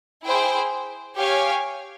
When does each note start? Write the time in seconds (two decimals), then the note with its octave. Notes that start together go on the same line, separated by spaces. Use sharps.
0.24 E4 G#4 C5 G5
1.17 G4 C#5 F5 G#5